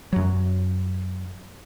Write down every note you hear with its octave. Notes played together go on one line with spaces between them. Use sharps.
F#2 F#3